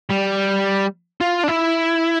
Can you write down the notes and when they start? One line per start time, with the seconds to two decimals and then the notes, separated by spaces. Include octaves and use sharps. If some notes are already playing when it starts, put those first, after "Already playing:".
0.10 G3
1.21 F4
1.44 D4
1.48 E4